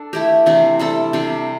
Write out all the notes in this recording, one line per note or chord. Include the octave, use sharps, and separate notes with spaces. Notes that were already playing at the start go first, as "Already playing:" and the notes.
Already playing: D4 A4
A3 E4 G4
C3 E3 A3 D4
G3 C4 A4
C3 G3 D4 G4